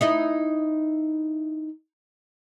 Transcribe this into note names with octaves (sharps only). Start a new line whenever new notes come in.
D#4 E4 D#5